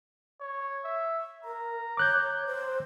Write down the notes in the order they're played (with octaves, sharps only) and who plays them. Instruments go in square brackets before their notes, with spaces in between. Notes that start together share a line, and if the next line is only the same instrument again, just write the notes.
[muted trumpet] C#5
E5
[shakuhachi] A#4 [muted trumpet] A#5
[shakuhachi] C#5 [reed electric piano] D6 F#6 G6
[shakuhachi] C5